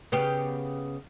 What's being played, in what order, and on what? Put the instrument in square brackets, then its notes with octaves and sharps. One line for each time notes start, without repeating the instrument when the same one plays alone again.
[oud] C#3 B3 G4